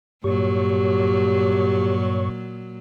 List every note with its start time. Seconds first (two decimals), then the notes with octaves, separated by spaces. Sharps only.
0.24 G2 A#2 F#3 G4 C#5 C#6